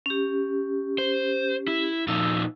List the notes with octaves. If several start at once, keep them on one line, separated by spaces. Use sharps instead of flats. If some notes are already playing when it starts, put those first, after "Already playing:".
C#4 G4
C5
E4
A#2 F3 D#4 E6